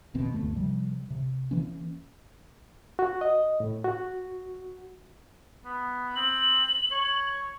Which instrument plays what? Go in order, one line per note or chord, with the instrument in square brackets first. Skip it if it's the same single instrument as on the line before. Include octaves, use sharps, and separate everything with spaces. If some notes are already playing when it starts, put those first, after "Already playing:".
[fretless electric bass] F1 D#2 B2 C4
E1 D2 G2 A3
C3 F3 G3
C3
E3 A#3 C#4
[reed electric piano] F#4
D#5
A2
F#4
[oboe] B3
[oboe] C4 [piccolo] F#7
[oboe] C#5